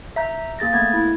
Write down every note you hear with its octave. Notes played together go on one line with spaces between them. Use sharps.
E5 A#5 G6
A#3 G#4 A6 A#6
A3 B3 G#6
E4